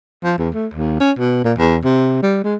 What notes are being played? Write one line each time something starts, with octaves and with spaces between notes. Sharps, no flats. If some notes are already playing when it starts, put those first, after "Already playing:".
F3
E2
A3
D#2
C#4
B2
A#2
E2
C3
G3
G#3